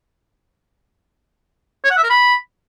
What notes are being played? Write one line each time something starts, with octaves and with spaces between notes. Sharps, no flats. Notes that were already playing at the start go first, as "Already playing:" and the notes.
C#5
F#5
E5
A#4
B5